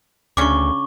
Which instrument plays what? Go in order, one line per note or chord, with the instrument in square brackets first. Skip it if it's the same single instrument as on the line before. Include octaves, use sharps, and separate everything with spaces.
[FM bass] D2 [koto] C#3 C#4 D4 [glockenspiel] C#6 D6